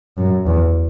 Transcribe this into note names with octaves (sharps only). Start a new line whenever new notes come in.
F#2
E2